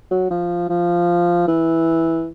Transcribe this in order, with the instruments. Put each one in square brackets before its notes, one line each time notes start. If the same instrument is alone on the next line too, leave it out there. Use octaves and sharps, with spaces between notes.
[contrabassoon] F#3
F3
F3
E3